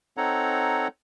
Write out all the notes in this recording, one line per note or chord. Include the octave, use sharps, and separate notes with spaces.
C4 D#4 A4 C#5 F#5 A#5